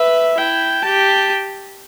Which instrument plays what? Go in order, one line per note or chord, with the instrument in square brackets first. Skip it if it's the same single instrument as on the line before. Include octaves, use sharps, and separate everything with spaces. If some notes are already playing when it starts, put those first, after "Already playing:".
Already playing: [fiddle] B4 [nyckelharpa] E5
[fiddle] E4 [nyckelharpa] G5
[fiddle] G4 [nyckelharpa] A5